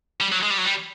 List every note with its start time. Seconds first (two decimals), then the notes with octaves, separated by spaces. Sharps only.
0.21 G3
0.32 F#3
0.43 G#3
0.50 G3
0.58 F#3
0.65 G3